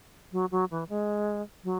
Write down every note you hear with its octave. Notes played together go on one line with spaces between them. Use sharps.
F#3
F#3
E3
G#3
F#3